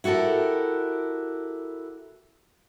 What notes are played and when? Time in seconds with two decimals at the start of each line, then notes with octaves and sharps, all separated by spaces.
0.04 E4 F#4 G4 A4 A#4